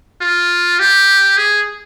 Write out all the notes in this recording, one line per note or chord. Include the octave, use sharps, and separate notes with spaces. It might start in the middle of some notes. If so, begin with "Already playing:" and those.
F4
G4
G#4